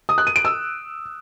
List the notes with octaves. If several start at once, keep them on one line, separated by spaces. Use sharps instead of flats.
D#6
F#6
D#7
D7
E6